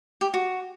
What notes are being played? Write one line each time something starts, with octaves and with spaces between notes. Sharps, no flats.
G4
F#4